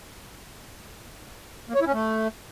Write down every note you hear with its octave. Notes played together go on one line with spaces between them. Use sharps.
A#3
C#5
E4
C#4
A3